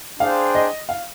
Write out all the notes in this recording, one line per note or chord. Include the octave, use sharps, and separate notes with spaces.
D4 G#4 C5 F5 G5
D#5
F5